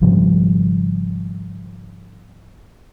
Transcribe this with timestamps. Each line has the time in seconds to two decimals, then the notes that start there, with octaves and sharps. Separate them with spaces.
0.01 G#1 C#3 F3 G3